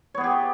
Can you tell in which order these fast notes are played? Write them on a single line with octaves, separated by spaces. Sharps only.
C#5 B3 G#4 G4